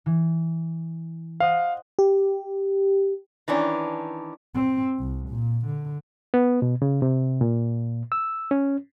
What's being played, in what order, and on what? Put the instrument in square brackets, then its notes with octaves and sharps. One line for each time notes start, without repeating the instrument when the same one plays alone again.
[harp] E3
[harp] C5 D#5 F#5 [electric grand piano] F5
[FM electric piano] G4
[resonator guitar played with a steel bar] D#3 E3 C#4 D4
[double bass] C4
C2
A#2
D3
[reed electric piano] B3
B2
C#3
C3
A#2
E6
C#4